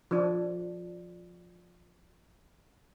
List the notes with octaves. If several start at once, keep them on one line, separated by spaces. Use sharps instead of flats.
F3 D4